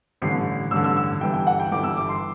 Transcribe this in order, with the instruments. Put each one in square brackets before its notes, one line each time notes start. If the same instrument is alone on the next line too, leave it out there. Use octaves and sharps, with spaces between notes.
[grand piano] A1 G2 D3 C7
A1 G2 D3 E6
E6
E6
G1 G2 E3 G5
G5
F#5
G5
G1 G2 E3 D6
E6
D6
C6